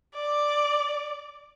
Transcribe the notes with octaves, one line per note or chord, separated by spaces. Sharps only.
D5